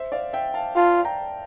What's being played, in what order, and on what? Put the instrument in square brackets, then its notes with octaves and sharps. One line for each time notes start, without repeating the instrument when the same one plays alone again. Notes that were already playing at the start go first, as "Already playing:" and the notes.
Already playing: [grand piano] C5 E5
D5 F5
E5 G5
F5 A5
[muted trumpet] F4 [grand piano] F5 A5
[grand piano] G5 A#5